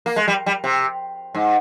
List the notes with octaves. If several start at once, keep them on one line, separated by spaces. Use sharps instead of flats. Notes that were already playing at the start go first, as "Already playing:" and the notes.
A#3
G#3
G3
G3
C3
G#2